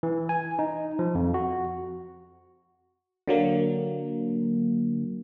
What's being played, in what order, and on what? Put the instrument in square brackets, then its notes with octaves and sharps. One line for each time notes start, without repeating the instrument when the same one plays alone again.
[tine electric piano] E3
G#5
D#4
F3
F2
F#4
[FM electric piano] D3 F#3 A#3